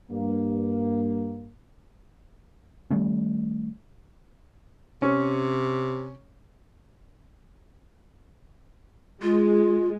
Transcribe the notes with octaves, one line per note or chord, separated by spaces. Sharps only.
G2 A#3
D#3 G3 A3 C#4
C3 C#4
G#3 F4